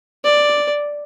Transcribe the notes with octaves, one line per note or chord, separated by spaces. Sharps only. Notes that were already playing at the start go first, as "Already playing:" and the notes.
D5